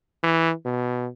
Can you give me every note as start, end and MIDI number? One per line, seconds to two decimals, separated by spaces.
0.23 0.52 52
0.66 1.08 47